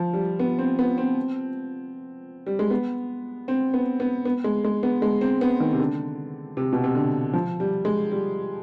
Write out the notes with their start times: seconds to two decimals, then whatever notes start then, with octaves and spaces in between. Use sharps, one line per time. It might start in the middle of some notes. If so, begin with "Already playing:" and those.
Already playing: F3
0.13 G3
0.39 B3
0.58 C4
0.79 B3
0.98 C4
2.47 G3
2.59 G#3
2.70 B3
3.48 C4
3.74 B3
4.00 B3
4.25 B3
4.44 G#3
4.65 G#3
4.83 B3
5.02 G#3
5.21 C4
5.41 B3
5.60 D#3
5.73 C3
5.80 D3
6.57 C3
6.73 B2
6.84 C3
6.95 D3
7.33 F3
7.60 G3
7.85 G#3
8.12 G3